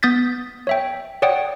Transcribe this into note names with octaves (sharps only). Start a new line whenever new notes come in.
B3 D#6 G6 A6 B6
C#5 E5 G5
C#5 D5 F#5 G5 D#6